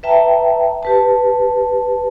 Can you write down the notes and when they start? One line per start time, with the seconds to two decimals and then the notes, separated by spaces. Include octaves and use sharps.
0.03 B4 E5 G5 A5 A#5
0.83 G4 B4 A5